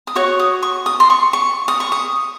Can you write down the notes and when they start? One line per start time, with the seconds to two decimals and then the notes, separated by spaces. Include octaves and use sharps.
0.07 D#6
0.16 F#4 C#5 C#6
0.40 D#6
0.63 C#6
0.86 D#6
1.00 C6
1.10 C#6
1.33 C#6
1.68 D#6
1.80 C#6
1.92 D#6